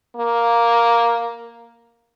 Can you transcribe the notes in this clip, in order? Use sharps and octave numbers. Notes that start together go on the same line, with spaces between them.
A#3